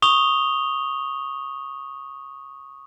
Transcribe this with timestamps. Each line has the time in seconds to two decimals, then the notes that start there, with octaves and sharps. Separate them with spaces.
0.02 C#6 D#6 F7 G7